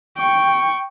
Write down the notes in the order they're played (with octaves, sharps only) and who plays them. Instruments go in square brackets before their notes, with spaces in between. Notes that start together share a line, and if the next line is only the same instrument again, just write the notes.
[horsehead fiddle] G5 [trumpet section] C#6